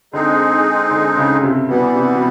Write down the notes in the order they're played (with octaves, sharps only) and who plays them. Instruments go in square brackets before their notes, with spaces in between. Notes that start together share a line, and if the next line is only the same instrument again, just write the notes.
[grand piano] D3 [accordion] G#3 C4 D#4 G#4
[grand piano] D3
C#3
C3
[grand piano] B2 [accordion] E3 G3 B3
[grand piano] C3
B2